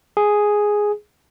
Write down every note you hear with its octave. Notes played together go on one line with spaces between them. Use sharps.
G#4